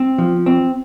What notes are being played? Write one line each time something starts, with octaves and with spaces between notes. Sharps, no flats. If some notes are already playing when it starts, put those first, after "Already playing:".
Already playing: C4
F3
C4